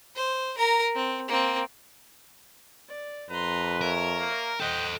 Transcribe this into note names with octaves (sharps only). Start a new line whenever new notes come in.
C5
A#4 A#5
C4
A#3 C4
D5
F2 B4 A#5 C6
A#4 C#5 E5
A#3
A4 C5 D#5 F#5 G5